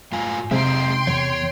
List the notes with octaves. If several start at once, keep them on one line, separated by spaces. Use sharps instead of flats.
G#2 F4 G#5
C3 G#3 C4 D#4 E5 G5 C6 D7
E2 C#5